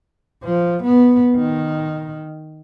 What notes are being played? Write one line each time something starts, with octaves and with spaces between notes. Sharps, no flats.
F3
B3
D#3